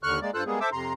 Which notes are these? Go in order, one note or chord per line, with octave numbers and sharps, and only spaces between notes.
D#2 D3 C#6 F6 F#6
G#3 A#3 D5
G2 F4 A4 C5 E6 F#6
G3 G#3 A#3 B3 G#4
A4 C5 E5 D6 E6
F2 C3 A#5 C6